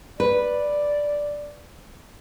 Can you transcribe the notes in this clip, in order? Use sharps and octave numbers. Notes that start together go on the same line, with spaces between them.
B4 D5